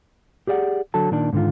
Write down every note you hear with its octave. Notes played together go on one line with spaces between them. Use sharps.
G4 G#4 D5 F5 F#5
D3 F#3 A4 A5
A#2 D#3 D4
G#2 D3 D#3 F4